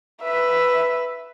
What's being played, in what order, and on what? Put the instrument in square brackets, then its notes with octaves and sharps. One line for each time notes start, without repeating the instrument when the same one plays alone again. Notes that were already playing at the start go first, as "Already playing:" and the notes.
[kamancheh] B4 E5